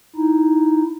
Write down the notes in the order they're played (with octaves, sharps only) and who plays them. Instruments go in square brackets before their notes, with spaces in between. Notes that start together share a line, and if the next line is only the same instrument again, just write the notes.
[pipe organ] D#4 E4